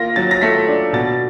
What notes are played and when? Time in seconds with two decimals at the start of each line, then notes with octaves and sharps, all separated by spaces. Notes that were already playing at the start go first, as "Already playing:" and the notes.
Already playing: A#3 F4 A#6
0.16 F#3 A6
0.31 A#6
0.41 A3 B6
0.68 D4
0.93 B2 A6